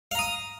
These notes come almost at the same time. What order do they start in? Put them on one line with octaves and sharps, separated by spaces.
F5 A#5 D#6